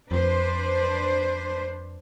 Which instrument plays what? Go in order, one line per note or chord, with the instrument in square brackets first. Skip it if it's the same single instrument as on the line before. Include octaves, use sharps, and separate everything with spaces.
[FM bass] F2 [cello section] D4 B4 C5